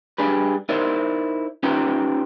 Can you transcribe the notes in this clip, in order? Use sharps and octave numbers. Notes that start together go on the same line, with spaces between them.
G3 D4 G#4 B4
D#4 E4 A#4 C5 D5
C#4 D#4 F4 G4 B4 A#5